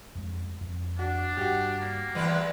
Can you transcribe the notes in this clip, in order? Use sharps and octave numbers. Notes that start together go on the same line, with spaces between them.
F2 G#3
F2
D4 F#4
G2 F#4 G4
A#3
E2 E3 G3 G#3 B4